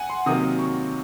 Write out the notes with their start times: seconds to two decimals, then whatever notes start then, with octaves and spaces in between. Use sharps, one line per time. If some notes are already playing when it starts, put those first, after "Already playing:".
Already playing: F#5 G#5
0.10 C6
0.26 C3 D#3 F#3 A#3 D#6
0.59 C#6